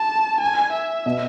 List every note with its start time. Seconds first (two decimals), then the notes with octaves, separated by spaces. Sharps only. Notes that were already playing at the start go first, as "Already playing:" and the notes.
Already playing: A5
0.41 G#5
0.73 E5
1.06 B2